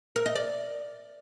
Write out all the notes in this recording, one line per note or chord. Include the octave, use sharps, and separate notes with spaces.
A#4
D#5
D5